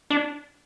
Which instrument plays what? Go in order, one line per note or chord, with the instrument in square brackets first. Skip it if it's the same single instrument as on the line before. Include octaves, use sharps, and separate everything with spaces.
[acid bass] D4